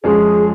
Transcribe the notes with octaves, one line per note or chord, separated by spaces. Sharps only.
F2 F3 G#3 C#4 G#4